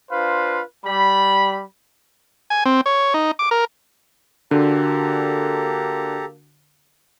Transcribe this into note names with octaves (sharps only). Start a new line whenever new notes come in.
D4 F4 B4 C5 F5
G3 B5
G#5
C4
C#5
D#4
D6
A#4
D3 A#3 D4 F#4 G4 A4 A#5